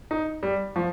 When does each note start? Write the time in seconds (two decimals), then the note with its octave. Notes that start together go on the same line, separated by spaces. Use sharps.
0.11 D#4
0.43 G3
0.76 F3